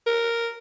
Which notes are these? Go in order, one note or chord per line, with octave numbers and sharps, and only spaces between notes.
A#4